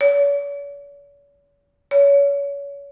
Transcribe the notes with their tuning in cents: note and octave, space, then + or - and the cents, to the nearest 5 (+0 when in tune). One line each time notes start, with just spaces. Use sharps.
C#5 +45
C#5 +30